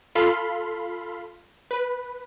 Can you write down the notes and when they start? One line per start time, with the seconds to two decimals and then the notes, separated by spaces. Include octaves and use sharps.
0.15 F4 A4 F5 B5 C6
1.71 B4